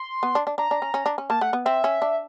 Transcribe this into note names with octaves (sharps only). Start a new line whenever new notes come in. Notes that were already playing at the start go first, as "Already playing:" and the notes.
Already playing: C6
B3
D4
D4
D4 A#5
D4
C#4
C#4
D4
C#4
A#3 A5
A3 F#5
B3
C4 E5
C#4
D4